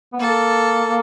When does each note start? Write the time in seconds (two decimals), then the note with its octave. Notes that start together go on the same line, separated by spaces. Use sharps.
0.13 B3
0.20 A#3 A4